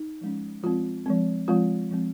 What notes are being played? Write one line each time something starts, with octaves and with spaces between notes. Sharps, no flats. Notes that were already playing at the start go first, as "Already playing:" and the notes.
Already playing: D#4
F3 G#3 C#4
F3 G#3 C4 F4
F3 G#3 C4
F3 G#3 C4 F4
F3 G#3 C4